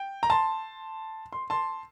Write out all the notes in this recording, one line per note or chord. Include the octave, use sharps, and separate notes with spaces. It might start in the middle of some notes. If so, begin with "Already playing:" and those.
Already playing: G5
A#5
A5 C6
C6
A5 C6